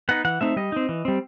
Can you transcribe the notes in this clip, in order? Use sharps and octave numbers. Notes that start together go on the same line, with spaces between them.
B3 D#4 F#5
E3 F#5
A3 C4 D#4 E5
G3 D#5
C4 D#4
E3
G3 C4